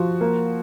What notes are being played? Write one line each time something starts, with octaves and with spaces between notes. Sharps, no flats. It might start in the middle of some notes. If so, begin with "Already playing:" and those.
Already playing: F3 F#4
A#3